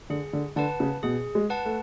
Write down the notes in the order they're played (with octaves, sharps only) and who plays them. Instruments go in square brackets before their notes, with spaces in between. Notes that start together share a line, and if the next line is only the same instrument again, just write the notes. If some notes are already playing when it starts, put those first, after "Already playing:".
[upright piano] D3 [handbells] G#4
[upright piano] D3
[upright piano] D3 [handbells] B4 F#5 A5
[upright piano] C#3
[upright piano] B2 [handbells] G#4
[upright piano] G#3
[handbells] B4 F#5 A5
[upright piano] A3